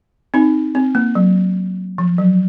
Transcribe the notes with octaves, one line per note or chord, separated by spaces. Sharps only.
C4 D#4
C4
A#3
F#3
F3
F#3